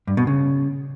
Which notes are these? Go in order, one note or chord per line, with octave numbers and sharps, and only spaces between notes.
G2
B2
C#3